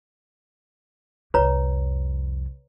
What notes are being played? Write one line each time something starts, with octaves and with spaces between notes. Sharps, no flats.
C2 F2 B4 C#5 A#5